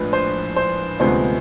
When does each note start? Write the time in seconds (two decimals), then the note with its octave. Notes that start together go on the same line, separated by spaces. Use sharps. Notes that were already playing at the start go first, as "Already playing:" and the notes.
Already playing: A#1 A2 F3 G#3 B4
0.13 C5
0.56 C5
1.00 D2 C3 F3 G#3 B3 C5